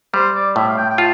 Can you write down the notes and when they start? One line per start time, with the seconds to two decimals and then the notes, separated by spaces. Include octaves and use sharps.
0.14 G3 C5
0.35 D5
0.56 A2 E5
0.68 F5
0.77 G5
0.90 G5
0.98 F4 A5